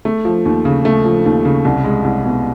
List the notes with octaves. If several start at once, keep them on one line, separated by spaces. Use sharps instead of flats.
A3
F3
D#2
C#3
A3
F3
D#2
C#3
C2
G#3
C2
B2